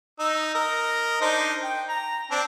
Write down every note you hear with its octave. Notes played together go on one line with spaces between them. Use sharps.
D#4 E6
A#4 D#5
D4 D#4 C5
G5
A#5
C4 D4